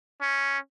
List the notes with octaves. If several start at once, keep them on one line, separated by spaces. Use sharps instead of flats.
C#4